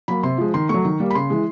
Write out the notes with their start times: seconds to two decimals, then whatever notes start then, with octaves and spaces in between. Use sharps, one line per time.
0.08 F#3 A#3 B5
0.23 C3 C6
0.38 F3 G#3
0.54 D#3 C6
0.69 F#3 A3 C#6
0.85 D#3
1.00 G3 A#3
1.10 B5
1.15 C#3 C6
1.30 E3 G#3